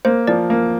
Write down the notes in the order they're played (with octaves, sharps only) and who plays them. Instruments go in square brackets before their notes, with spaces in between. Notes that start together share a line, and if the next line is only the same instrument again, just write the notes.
[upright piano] A#3 [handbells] C5
[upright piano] F3 [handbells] D5
[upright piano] A#3